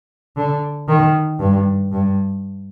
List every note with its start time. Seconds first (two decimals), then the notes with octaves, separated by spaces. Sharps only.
0.37 D3
0.88 D#3
1.40 G2
1.92 G2